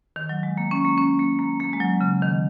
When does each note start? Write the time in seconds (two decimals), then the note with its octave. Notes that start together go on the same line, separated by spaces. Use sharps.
0.16 D#3
0.29 F#3
0.43 G#3
0.58 A#3
0.71 C#4
0.85 A#3
0.98 C#4
1.19 A#3
1.39 A#3
1.60 A#3
1.73 G#3
1.80 F#3
2.01 C#3
2.22 D#3